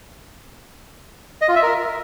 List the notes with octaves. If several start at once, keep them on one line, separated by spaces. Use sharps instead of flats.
D#5
F4
E5
A#4